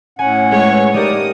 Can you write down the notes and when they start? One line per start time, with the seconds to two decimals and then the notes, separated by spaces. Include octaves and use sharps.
0.19 A2 C#4 F#5 G#5
0.52 G#3 B4 C#5
0.94 A3 D#4 G4 A#4 D5 D#6